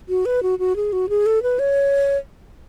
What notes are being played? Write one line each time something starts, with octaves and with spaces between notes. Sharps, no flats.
F#4
B4
F#4
F#4
G#4
F#4
G#4
A4
B4
C#5